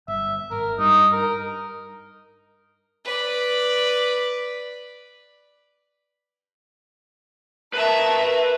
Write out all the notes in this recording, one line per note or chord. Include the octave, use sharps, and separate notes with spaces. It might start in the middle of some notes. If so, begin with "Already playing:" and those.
G1 E5
G#1 A#4
G2 D#4
A#4
B4 D5
A#4 B4 E5 A5